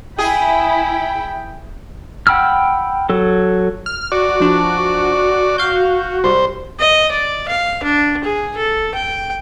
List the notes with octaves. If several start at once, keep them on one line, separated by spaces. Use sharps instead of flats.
E4 G#4 G5 B5
F#5 G5 B5 E6 F6
F#3 A4
F6
F#4 D5
F3 D4
F5 G6
C2 G3 C5
D#5
D5
F5
D4
G#4
A4
G5